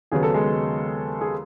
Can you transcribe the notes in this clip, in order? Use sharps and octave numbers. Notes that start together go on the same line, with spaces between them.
D#2 C#3 F#3 B3 G#4
A4
G#3 G#4
G#4